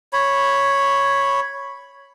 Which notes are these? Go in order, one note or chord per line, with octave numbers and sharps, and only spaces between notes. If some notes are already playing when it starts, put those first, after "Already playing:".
C#5 B5